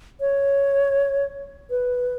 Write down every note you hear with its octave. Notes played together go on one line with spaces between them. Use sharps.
C#5
B4